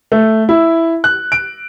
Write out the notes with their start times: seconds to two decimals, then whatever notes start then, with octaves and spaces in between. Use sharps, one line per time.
0.12 A3
0.49 E4
1.04 F#6
1.32 D7